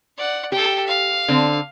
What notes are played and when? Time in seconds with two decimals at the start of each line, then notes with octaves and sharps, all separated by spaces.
0.17 D5 F#5
0.52 G4 A4 G5
0.87 F5
1.28 D3 C4